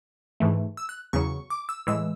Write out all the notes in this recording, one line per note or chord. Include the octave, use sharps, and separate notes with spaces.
G#2 E3 A3
E6
F#6
E2 C#3 F#3 C#6
D6
E6
A2 E3 G#3 E6